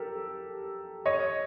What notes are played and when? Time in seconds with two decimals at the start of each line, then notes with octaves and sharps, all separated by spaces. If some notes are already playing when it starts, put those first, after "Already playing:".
Already playing: G4 A4 A#4
1.06 C#5 D#5